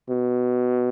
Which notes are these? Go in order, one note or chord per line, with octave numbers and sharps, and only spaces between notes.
B2